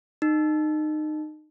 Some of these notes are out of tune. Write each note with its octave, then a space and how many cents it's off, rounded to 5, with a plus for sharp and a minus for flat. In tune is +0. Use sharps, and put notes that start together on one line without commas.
D#4 -25